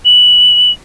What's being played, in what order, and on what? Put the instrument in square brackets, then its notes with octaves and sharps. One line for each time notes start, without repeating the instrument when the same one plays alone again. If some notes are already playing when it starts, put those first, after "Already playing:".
[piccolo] F#7